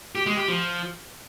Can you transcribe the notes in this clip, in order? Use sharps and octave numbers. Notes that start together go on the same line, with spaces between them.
G4
G#3
G4
F3